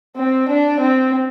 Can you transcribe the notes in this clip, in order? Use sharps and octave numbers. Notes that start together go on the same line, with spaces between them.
C4
D4
C4